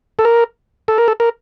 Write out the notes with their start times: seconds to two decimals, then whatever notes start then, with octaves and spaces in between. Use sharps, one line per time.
0.19 A4
0.25 A#4
0.88 A4
0.98 A#4
1.08 A4
1.20 A#4